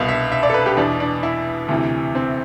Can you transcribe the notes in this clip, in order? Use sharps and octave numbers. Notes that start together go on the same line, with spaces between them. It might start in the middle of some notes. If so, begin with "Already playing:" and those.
Already playing: C2 B2 F5
E5
E5
D5
A4
B4
G4
E2 B2 D4
D4
E4
D2 C3 E3
C4